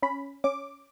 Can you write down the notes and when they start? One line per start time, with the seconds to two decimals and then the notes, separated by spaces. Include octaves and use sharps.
0.02 C#4 B5
0.44 C#4 D6